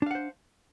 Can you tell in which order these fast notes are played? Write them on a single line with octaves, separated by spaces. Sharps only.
D4 F5 F#5 C5